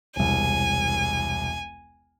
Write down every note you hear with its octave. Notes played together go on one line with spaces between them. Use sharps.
E1 C2 G#5